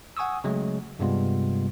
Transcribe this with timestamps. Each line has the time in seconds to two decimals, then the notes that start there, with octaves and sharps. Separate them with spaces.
0.17 F#5 G#5 C#6 D#6 E6
0.44 C#3 F#3 G#3 A3
0.99 G2 C3 G3 G#3 B3 F4